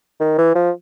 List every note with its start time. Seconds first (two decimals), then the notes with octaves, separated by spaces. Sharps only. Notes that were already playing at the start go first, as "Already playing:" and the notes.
0.20 D#3
0.38 E3
0.55 F3